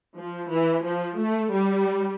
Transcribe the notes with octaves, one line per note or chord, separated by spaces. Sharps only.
F3
E3
F3
A3
G3